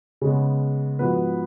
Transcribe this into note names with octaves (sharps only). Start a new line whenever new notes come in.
C#3 G#3 B3
G#2 F3 B3 F#4 B4